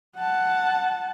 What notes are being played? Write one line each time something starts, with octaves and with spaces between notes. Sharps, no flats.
F#5 A5